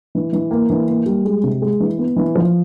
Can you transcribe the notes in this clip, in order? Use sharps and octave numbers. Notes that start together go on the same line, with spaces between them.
E3
E3
A#3
E3
A#3
G3
G#3
C3
G#3
E3
B3
E3
F3